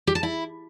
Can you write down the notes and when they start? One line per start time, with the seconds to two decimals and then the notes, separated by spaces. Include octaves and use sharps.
0.07 G4
0.15 A5
0.23 E4